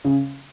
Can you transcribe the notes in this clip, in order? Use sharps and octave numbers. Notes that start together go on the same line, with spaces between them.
C#3